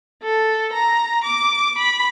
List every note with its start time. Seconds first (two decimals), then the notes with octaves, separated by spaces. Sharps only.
0.23 A4
0.73 A#5
1.24 D6
1.78 B5